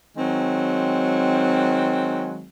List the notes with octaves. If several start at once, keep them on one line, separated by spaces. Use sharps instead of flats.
D#3 F#3 G#3 C4